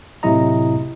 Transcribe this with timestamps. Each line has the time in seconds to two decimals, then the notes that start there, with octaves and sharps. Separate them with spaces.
0.23 A2 C3 F#3 E4 D#5 A#5